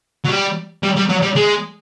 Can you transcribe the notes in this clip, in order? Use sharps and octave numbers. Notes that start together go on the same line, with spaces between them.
F#3
G3
G3
G3
F#3
G3
G#3